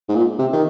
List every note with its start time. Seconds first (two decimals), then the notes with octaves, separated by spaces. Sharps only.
0.09 G#2
0.15 A#2
0.39 C3
0.53 D#3